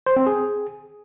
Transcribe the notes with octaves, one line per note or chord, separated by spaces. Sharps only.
C5
C4
G#4